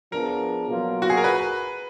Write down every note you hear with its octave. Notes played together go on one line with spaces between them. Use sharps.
F3 B3 D4 G#4 A#4
B2 F#3 A#3 F4
F#4
G#4
A#4
B4